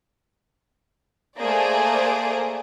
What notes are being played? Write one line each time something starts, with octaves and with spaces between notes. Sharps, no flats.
A3 A#3 G#4 C5 D5